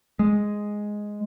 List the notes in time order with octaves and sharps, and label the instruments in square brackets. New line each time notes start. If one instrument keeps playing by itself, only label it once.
[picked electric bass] G#3